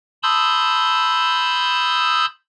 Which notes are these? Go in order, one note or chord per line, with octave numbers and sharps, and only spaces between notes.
A5 B5 C6 D#6 E6 G6